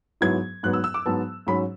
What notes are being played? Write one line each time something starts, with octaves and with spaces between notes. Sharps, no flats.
G#2 F#3 B3 E4 G#6
G#2 F#3 B3 F#6
E6
E6
D6
G#2 F#3 B3 A5
G#2 F#3 C#4 B5